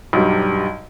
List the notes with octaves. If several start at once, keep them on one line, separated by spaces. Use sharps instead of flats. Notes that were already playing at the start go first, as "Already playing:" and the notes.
B1 G2 F#3 G3